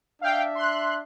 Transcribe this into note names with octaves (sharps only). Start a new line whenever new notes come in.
D4 E5 F5 G5
C6 F#6